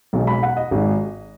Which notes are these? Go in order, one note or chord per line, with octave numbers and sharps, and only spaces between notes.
B1 B2 G#3
B5
F#5
D#5
G#1 G#2 G#3